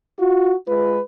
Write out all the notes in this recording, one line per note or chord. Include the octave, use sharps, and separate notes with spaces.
F4 F#4
G#3 F4 B4